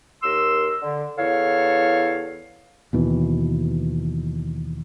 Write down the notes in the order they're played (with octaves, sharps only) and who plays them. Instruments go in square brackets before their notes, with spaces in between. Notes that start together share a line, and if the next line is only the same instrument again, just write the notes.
[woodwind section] D#2 A#4 C6 E6
D3
E2 E4 A4 C#5 F5
[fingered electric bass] D#2 B2 E3